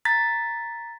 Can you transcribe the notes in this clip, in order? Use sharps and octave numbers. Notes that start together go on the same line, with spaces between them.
A#5 A6 B6